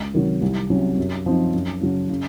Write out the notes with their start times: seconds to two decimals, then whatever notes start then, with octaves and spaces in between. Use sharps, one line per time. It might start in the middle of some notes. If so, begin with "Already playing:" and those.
Already playing: C#2
0.14 C3 D#3 F#3
0.42 C2
0.70 C3 F#3 C#4
0.98 F#2
1.26 F3 C4 D#4
1.54 F#2
1.81 C#3 F#3
2.10 C#3